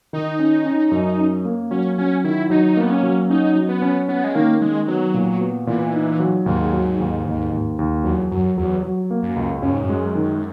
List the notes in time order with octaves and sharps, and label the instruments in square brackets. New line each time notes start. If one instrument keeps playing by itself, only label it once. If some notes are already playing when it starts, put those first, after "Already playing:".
[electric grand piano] D#3 [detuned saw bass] D#4
[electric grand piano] C#4
C#4
F#2
C#4
A#3
[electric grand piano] F#3 [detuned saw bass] C#4
[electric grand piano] F#3 [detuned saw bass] C#4
[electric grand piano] D#3 [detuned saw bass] E4
[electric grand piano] F#3 [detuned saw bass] D#4
[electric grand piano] A#3 [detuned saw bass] B3
[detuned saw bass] C#4
[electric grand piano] F#3
[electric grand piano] C#4 [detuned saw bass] D#4
[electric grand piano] F#3
[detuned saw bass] B3
[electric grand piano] C#4
[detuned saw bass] B3 [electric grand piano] C#4
[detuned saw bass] G#3
[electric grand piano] D#3 [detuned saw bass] A#3
[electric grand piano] D#3 [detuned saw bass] G#3
[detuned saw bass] F#3 [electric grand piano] B3
[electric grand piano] A#2
B3
[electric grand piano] A#2 [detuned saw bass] E3
[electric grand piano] D#4
F#3
[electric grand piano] D#2 [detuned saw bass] G#2
[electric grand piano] F#3
D#2
D#2
D#2
D#2
[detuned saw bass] E2 [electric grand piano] F#3
[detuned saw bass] F#2 [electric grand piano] F#3
[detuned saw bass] E2 [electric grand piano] F#3
[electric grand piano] F#3
A#3
[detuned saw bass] F#2
[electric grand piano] C#2
[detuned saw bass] F#2 [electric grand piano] C#4
[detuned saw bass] G#2
F#2
[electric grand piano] G#3
D#3